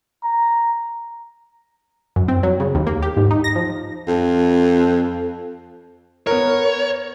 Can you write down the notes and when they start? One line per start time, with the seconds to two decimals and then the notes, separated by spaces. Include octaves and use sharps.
0.24 A#5
2.16 F#2
2.28 C4
2.43 F#3
2.60 C#3
2.75 D#2
2.87 A#3
3.02 G4
3.17 G#2
3.31 D#4
3.44 A#6
3.55 F3
4.08 F2
6.27 B3 A#4 C#5